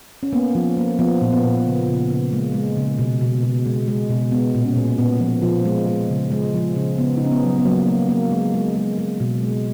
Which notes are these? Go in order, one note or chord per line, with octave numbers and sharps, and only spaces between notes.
C#4
A#3 B3
F3
A#3
F3 B3
A#2
B3
A#2
C#3
C#3
C#3
G#3 A#3
G#3
C#3
B2
B2
B2
G#3
G#3
B2
G#3 B3
A#2
C#4
A#2
A#2 B3
F3
F3
G#3
G#3
C#3
G#3
F3
C#3
C#3 B3
D#4
C#3 C#4
B3
F#3
B3
F#3 A#3
A#3
A#3
G#3
G#3
G#3
G#3
B2
G#3